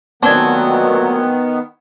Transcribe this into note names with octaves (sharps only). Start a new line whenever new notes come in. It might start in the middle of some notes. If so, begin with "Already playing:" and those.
D2 A#2 D#3 F#3 B3 C4 D4 G#5